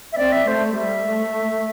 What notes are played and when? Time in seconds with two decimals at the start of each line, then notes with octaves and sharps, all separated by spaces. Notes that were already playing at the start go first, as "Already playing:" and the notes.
0.12 E5
0.18 C4 D5
0.32 E5
0.47 A3 C5
0.76 G3 E5
1.06 A3